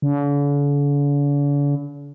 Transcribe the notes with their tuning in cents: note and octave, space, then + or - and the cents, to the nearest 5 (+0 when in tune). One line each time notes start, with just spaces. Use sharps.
D3 -45